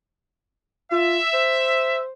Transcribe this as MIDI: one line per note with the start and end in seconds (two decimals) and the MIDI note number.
0.92 1.19 65
0.92 1.97 76
1.34 2.11 72